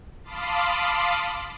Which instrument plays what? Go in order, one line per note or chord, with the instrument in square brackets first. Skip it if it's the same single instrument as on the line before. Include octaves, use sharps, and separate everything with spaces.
[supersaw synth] F5 A5 B5 C6 D6 D#6